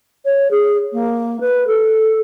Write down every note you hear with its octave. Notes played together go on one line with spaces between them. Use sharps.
C#5
G#4
A#3
B4
A4